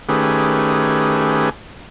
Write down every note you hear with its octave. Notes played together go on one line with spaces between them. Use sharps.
D#3 A3 C#4 G4 G#4 B4